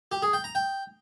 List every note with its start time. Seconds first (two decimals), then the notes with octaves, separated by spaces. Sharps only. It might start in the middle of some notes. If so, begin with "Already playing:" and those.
0.12 G4
0.22 G#4
0.33 G5
0.44 A#5
0.55 G5